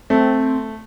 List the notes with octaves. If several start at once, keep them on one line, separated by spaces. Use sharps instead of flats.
A3 C4